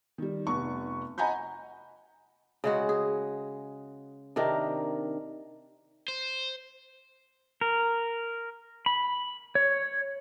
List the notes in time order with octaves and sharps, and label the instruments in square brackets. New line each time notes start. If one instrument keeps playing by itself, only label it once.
[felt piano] D#3 G3
F1 B3 C#6
D#5 F#5 G#5 A#5 B5 G6
[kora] C#3 G#3 F#4
G#4
C3 D#3 D4 A#4
[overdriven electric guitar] C5
[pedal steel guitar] A#4
B5
C#5